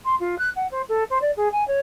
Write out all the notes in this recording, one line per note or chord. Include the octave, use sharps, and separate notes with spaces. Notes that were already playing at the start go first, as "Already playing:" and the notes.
C6
F4
F#6
F#5
C5
A4
C5
D5
G#4
G#5
C#5